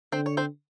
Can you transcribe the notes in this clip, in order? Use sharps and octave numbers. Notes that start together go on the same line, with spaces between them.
D3 C4 C5
C#5
C4 C5